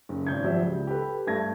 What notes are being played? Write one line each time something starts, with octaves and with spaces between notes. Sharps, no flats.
F#1
G#1 G6 G#6
F3 F#3 G4 D5 E5
C#2
G4 A4 B4
G2 A3 A5 G#6 A#6